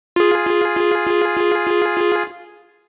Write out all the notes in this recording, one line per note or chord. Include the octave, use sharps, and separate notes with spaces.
F4 G#4